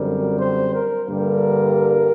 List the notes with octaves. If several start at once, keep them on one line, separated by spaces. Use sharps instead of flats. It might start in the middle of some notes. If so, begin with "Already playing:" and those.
Already playing: F#2 D3 G3 C4 A#4
C5
A#4
G2 D3 G3 A#3 A#4